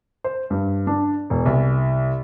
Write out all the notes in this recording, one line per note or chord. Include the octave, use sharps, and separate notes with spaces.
C5
G2
D4
E1
C2